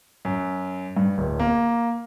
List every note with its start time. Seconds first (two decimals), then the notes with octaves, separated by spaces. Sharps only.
0.25 F#2
0.97 G2
1.18 D1
1.40 A#3